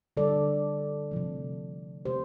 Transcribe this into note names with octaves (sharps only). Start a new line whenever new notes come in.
D3 G3 A4 D5
C3 F3 A3
C3 A3 G4 C5